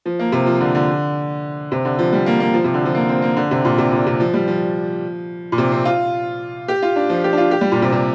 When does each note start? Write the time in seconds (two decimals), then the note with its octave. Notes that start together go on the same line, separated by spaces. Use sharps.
0.06 F3
0.19 A#3
0.32 C3
0.46 F3
0.60 D3
0.75 D3
1.72 C3
1.85 D3
1.99 F3
2.13 G3
2.26 A#3
2.40 A#3
2.54 F3
2.64 C3
2.74 D3
2.85 F3
2.95 A#3
3.09 C4
3.22 A#3
3.36 D3
3.51 C3
3.65 A#2
3.78 C3
3.92 A#2
4.06 C3
4.20 F3
4.34 G3
4.48 F3
5.52 A#2
5.58 C3
5.72 C4
5.85 F4
6.68 G4
6.82 F4
6.96 D4
7.09 F3
7.24 G4
7.33 D4
7.38 F4
7.51 G4
7.61 G3
7.72 A#2
7.82 C3
7.92 C3